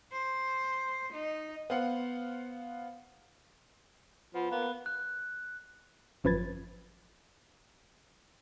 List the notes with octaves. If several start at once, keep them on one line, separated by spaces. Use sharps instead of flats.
C5
D#4
B3 C5 F5 F#5
F3 B3
A#3 B3
F#6
G#1 F#2 F3 B4 G#6 A6